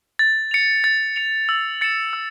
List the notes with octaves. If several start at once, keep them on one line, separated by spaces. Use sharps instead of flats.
A6
C#7 F7
A6
C#7 F7
E6
A6 C#7 E7
E6